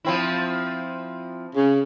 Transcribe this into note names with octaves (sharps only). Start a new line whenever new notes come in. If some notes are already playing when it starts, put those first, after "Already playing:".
F3 C4 E4
C#3